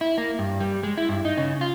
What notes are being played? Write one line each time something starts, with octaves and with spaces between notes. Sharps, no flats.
E4
A#3
G2
G3
G#3
E4
G2
D#4
C#3
F4